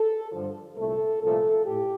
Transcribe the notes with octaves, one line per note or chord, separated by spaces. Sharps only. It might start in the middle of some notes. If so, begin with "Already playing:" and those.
Already playing: A4
G2 D3 F3
C2 A#2 A3 A4
C2 A#2 F3 A3 A4
A2 G4